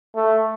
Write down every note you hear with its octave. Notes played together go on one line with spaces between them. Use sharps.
A3